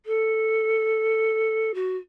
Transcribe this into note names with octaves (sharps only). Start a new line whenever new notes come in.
A4
F#4